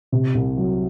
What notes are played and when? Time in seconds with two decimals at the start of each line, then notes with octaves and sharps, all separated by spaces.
0.12 C3
0.35 C2
0.57 F#3